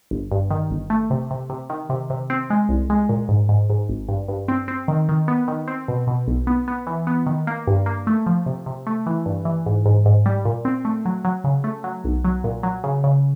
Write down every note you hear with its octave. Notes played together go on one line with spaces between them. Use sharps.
G1
G2
D#3
G1
A3
C3
C3
C3
D#3
C3
C3
C4
G#3
C2
G#3
A#2
G#2
G#2
G#2
G#1
G2
G2
C4
C4
D#3
D#3
B3
D#3
C4
B2
B2
B1
B3
B3
E3
B3
D#3
A#3
G2
A#3
A3
F3
C3
C3
A3
E3
G2
E3
G#2
G#2
G#2
G3
A#2
C4
A3
F#3
F#3
C#3
A3
F#3
B1
F#3
A#2
F#3
C#3
C#3